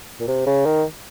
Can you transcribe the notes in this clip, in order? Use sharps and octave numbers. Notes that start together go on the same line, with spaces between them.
A#2
C3
C#3
D#3